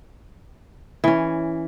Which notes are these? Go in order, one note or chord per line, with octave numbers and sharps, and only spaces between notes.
E3 C#4